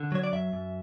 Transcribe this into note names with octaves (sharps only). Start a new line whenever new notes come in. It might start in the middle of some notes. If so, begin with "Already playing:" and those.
Already playing: D3
F#3 C#5
D5
F#2 E5
F#2